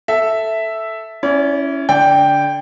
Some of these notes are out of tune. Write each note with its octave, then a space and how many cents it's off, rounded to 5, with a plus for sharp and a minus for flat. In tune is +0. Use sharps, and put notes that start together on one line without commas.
A4 +0 E5 +0
C#4 +0 E4 +0 D5 -40
D3 -25 D5 +0 G5 +0